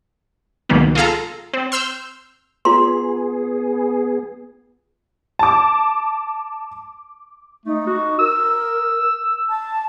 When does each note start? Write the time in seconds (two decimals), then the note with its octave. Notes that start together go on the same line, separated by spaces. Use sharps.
0.69 C#2 B2 D#3 F#3 A#3 B3
0.95 F4 G#4 A4 F5 A#5
1.53 C4
1.72 C6 E6 F6 G6
2.65 B3 F4 G#4 C6
5.39 A5 D6
7.65 A3 D#4
7.87 F#4
8.19 A#4 E6
9.49 A5